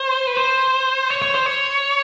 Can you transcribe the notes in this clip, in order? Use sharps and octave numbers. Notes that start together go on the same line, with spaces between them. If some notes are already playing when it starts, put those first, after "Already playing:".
Already playing: C5
B4
C5
C#5
C#5
C5
C#5